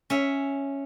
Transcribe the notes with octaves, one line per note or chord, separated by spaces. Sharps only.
C#4 E5